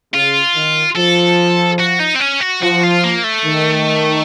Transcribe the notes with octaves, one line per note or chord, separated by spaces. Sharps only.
C#3 F4
D#3
F3 A4
F#4
D#4
C4
C#4
F#4
F3 F#4
F4
A#3
A3
D#3